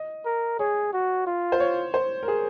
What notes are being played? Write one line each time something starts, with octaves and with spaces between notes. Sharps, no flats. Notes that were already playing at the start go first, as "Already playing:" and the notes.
Already playing: D#5
A#4
G#4 C#5
F#4
F4
C5
C#5
C5
A#4
G#4